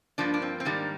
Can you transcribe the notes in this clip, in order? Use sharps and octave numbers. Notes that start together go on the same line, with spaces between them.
G2 F3 A#3 D4
D4
C4
C4
G#2 D#3 G3 A#3 D4